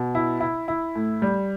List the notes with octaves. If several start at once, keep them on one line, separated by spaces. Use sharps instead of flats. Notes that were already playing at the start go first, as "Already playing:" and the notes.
Already playing: B2
E4
E4
E4
A2
G3